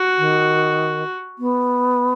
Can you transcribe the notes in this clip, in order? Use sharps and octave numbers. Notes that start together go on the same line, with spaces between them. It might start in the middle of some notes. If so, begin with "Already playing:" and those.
Already playing: F#4
D#3
B3